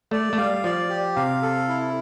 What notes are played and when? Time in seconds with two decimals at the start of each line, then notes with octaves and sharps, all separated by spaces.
0.11 A3 D5
0.33 A3
0.37 G3 F5
0.64 F3 D5
0.90 G4
1.16 C3 F5
1.42 A4
1.68 E4